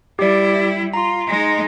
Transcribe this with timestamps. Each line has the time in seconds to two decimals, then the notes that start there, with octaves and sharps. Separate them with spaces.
0.19 G3 E4 G4 D5
0.94 F4 A#5 C6
1.27 G#3 D#4